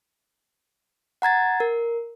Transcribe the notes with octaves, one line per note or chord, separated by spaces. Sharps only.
F#5 A#5 G#6 A6
A#4